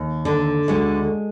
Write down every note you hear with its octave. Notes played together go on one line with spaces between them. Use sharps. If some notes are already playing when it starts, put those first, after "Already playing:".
Already playing: D#2
D3
D2 G#3